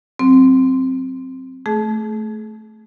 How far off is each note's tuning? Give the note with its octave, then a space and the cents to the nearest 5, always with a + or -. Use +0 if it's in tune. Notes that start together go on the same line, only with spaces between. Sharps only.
F#3 +0 C4 +0
A3 -10 G#4 +25